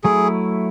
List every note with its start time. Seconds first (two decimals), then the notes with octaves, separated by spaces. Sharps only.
0.04 F#3 A3 E4 G#4